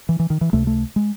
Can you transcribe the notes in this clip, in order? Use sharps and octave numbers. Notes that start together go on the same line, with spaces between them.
E3
E3
D#3
E3
C#2 C3 A3
A3
G#3